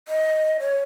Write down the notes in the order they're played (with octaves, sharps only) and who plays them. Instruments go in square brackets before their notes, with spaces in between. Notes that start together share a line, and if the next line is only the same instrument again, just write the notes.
[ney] D#5
C#5